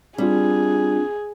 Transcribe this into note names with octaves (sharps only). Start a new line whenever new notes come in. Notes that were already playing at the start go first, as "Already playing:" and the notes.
G3 C4 D4 F4 G#4